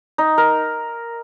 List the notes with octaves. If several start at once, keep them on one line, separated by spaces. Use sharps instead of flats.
D#4
A#4